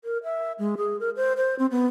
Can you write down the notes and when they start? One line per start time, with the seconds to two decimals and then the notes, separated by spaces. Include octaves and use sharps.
0.04 A#4
0.24 E5
0.59 G#3
0.77 G#4
1.00 A#4
1.16 C5
1.37 C5
1.59 C4
1.71 B3